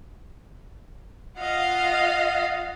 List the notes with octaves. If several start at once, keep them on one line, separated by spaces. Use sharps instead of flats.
F4 D#5 F5 F#5